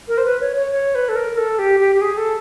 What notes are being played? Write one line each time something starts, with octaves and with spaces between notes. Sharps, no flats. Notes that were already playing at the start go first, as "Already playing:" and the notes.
A#4
C5
B4
C#5
C#5
C#5
B4
A4
A#4
A4
G4
G4
G4
G#4
A4